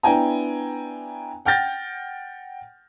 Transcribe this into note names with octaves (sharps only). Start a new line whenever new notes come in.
B3 D4 E4 G5 G#5 A#5
F#5 G5 F6 G6 A6 A#6